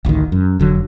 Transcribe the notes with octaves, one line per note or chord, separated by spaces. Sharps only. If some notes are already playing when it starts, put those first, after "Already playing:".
D1 A1 D2 D#3
F#2
F1 D3 F#3